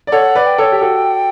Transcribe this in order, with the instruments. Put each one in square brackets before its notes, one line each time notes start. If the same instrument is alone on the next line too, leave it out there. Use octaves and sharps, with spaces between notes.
[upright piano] D5
[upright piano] A4 C#5 [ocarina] F#5
[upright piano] B4 D5
[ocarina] G5
[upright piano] A4 C#5
G4
F#4 A4